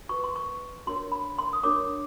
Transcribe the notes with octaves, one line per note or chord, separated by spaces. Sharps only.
F#4 B4 C#6
C6
C#6
D4 F#4 A#4 C#5 C6
B5
C6
D#6
D4 F#4 A#4 C#5 D6